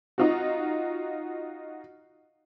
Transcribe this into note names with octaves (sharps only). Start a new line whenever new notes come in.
D#4 F4 F#4